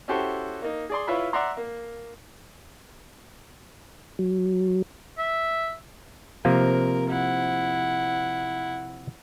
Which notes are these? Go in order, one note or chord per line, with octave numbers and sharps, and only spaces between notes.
C#4 E4 F#4 G4 A4 C5
A#3 D#4
G#4 D5 C6
E4 F4 B4 C#5 E5 B5
D5 E5 F#5 A#5 C6
A#3
F#3
E5
C3 F3 A#3 A#4
E4 F#5